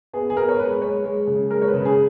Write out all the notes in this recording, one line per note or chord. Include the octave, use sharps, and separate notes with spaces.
B3 G#4
G#4
B3 A#4
C#5
G#3 B4
G#3 C#5
G#3
C#3
G#3 A#4
C#5
B4
C#3
G#4